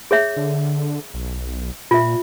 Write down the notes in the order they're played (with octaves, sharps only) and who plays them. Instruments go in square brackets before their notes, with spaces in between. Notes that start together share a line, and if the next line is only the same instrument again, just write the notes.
[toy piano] G#4 C#5 E5
[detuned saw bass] D3
B1
[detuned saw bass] A#2 [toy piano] F4 E5